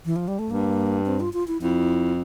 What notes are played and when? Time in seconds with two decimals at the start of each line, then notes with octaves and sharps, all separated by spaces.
0.05 E3
0.16 F3
0.28 G3
0.39 A3
0.50 G2 A#3
1.06 C4
1.20 F4
1.33 F4
1.47 E4
1.61 F2 E4